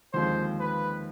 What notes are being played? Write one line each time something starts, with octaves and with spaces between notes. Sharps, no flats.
D#2 D3 F3 G#3 C4 C5
B4